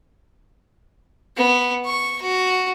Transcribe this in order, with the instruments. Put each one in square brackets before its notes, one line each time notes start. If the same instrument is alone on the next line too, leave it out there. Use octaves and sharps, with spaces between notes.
[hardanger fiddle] B3
C#6
F#4